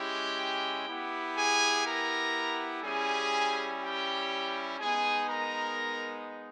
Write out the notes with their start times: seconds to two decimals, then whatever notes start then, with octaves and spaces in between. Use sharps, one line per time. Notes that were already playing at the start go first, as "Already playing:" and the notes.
Already playing: G#3 C#4 E4 G4 G5
0.88 B3 E4 G4
1.36 G#4 G#5
1.86 A#4 A#5
2.83 G3 C#4 E4 G4 G#4 G#5
3.81 G4 G5
4.79 G#3 B3 D#4 G#4 G#5
5.28 A#4 A#5